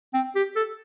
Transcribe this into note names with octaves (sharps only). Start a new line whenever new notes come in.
C4
G4
A4